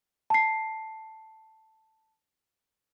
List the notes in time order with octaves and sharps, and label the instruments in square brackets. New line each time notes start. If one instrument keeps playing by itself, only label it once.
[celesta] A5 C7